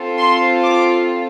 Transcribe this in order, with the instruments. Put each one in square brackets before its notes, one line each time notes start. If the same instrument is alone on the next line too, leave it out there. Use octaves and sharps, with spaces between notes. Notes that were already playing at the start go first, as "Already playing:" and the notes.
Already playing: [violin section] C4 F4 A4
C6
D6